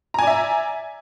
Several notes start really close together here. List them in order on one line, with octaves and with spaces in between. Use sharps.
A#5 G#5 D5 E5